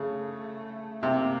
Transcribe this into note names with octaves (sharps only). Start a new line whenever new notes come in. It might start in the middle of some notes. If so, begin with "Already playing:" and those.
Already playing: C#3 A3
C3 A#3